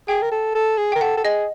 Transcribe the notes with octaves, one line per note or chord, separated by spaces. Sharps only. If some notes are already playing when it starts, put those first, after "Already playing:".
G#4 G5
A#4
A4
A4
G#4
A#4 G5
A4 F#5
A4
G#4 D#5